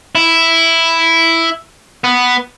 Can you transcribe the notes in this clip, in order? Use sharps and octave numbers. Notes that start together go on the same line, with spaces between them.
E4
B3